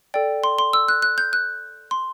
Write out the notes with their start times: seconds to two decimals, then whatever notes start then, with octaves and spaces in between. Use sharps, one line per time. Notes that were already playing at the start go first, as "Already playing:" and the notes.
0.14 A4 D5 G5
0.44 C6
0.59 C6
0.73 E6
0.88 F#6
1.02 F#6
1.18 G6
1.33 F#6
1.91 C6